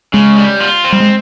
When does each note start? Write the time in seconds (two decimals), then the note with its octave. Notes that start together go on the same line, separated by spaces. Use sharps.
0.13 C#3 G#3
0.37 G3
0.61 F4
0.84 C4
0.93 G3
1.00 G#3